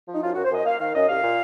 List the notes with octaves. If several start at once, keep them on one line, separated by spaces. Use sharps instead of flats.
F3
D#4
F#2 F4
F#2 F#4
C5
F#2 D#5
A#3 F5
D#3 F5
F#2 D#5
C2 F5
A#2